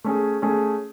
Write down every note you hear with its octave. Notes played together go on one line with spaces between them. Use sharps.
A3 C#4 G#4
A3 C#4 G#4